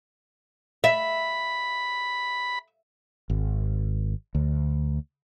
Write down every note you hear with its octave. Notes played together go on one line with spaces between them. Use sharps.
E5 B5
G#1
D2